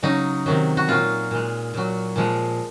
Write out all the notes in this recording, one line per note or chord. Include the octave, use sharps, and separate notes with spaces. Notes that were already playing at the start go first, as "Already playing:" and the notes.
C#3 F#3 D#4
C3 D#3 F#3
F#4
A#2 F#3 F4
A#2 G#3
A#2 F#3
A#2 F3 G#3